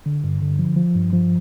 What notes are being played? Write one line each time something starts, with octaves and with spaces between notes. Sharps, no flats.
D3
G2
D3
F3
F3
G2
F3